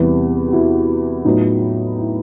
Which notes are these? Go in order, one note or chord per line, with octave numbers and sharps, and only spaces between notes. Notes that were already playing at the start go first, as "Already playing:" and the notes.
Already playing: E2 C3 E3 G3 B3
G4
E4 F#4
A2 F#3 B3 D#4 F4
E4